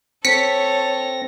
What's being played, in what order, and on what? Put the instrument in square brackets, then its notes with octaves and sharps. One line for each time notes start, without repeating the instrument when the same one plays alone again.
[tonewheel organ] C4 A#6 [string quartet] A4 C#5 [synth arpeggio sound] B6 C#7